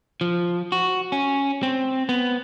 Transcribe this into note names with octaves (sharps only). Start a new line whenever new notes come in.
F3
F#4
C#4
C4
B3